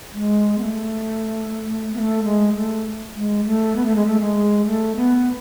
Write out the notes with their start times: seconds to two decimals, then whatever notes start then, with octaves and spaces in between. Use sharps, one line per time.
0.13 G#3
0.58 B3
0.62 A3
1.94 B3
1.99 A3
2.24 G#3
2.54 A3
3.15 G#3
3.45 A3
3.76 B3
3.86 A3
3.96 G#3
4.06 A3
4.21 G#3
4.66 A3
4.96 B3